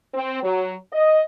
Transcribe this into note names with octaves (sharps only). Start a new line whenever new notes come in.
C4
F#3
D#5